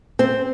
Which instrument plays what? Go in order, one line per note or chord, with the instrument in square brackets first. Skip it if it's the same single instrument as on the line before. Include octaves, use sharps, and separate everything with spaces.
[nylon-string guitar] C4